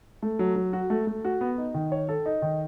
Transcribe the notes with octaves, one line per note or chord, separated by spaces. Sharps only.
A3
F#3
F#3
F#4
A3
A3
F#4
B3
D#4
D#3
C#5
A4
D#4
D#3